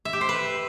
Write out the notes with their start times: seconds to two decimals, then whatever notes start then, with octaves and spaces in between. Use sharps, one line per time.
0.05 E5
0.13 G4
0.21 C5
0.29 B4